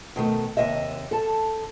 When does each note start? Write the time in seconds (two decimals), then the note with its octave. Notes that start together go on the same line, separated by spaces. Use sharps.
0.16 B2 D#3 A3
0.57 D#2 C3 D#5 E5
1.11 A4 A5